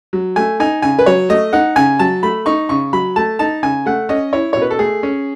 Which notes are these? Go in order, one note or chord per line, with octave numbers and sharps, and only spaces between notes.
F#3
A3 G#5
D#4 G#5
C#3 G#5
B4
F#3 C#5
A3 D#5
D#4 F#5
C#3 G#5
F#3 A5
A3 B5
D#4 C#6
C#3 C#6
F#3 B5
A3 A5
D#4 A5
C#3 G#5
A3 F#5
C#4 D#5
E4 C#5
B2 C#5
B4
A4
A3 G#4
C#4